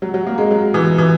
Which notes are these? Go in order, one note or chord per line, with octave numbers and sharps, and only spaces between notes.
F#3
F#3
A#3
G#3
F#3
E3
E3